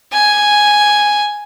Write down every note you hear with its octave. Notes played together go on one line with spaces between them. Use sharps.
G#5